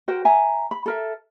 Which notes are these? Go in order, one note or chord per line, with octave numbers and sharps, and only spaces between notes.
F#4 A#4 C5 G5
E5 G#5 A#5
B5
A4 A#4 E5